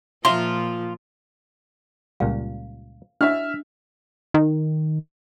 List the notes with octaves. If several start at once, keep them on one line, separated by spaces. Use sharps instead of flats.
A#2 F3 F4 E5 A#5 C6
C#2 A#2 G3 F5
D4 E4 F#4 C#5 D#5 E5 F6
D#3